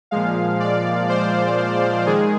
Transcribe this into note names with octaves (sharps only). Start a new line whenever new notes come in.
A#2 F3 G#3 F5
D5
C5
D#3 G#3 G#4